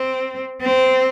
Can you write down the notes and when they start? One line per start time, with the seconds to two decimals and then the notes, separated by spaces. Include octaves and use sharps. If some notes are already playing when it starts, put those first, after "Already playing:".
Already playing: C4
0.61 C4